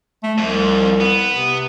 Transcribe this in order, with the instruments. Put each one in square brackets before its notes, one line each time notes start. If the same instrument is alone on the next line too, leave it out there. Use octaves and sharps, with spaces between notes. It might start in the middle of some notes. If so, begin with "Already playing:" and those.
[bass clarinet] A3
[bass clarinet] C2 [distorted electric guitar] F2
[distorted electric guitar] B3
[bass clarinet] C3